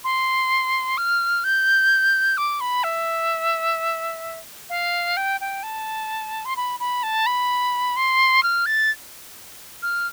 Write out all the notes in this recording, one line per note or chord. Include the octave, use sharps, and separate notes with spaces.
C6
F6
G6
D6
B5
E5
F5
G5
G5
A5
C6
B5
B5
A5
B5
C6
F6
A6
F6